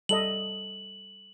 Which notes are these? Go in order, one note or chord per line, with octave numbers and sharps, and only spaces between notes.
G3 A4 D#5 F#7